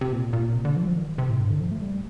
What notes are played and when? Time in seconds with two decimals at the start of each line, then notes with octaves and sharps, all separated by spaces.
0.01 C3
0.12 A#2
0.33 A#2
0.55 C3
0.65 D3
0.76 F3
0.83 G3
0.87 F3
0.97 D#3
1.18 C3
1.30 A2
1.40 G2
1.50 D3
1.60 F3
1.71 A3
1.81 G3